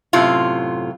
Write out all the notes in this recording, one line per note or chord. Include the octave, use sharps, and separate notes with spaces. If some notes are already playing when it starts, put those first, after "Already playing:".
F#2 A2 C3 F4